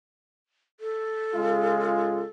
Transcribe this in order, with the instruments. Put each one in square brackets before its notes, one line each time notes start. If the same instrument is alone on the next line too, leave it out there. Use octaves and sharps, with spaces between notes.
[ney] A4
[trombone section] C#3 G#3 F4